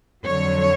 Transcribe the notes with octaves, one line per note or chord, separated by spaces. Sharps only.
F2 D3 F#3 C#5